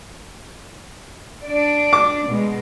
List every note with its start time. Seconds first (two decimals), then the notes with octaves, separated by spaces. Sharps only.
1.46 D4 D5
1.93 D6
2.28 B2 G#3